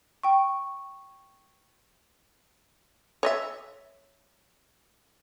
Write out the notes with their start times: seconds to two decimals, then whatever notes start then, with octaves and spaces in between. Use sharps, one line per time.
0.23 G5 C#6
3.23 C#5 D#5 E5